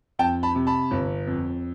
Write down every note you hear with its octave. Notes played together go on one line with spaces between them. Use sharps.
F2 G5 A5
A5 B5
C3
A5 B5
G1
F2